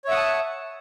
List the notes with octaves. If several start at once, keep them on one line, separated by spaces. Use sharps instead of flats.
C#5 E5 F#5 A5 D#6